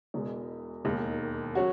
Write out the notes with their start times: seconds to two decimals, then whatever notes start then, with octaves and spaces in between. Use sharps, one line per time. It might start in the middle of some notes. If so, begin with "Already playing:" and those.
0.14 E1 E2 B2 G#3
0.85 E1 D#2 D#3 G#3
1.55 F#3 C#4 F#4